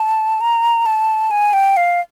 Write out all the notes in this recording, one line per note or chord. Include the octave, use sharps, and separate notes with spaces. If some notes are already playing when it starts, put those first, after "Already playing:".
Already playing: A5
A#5
A5
G#5
G5
F5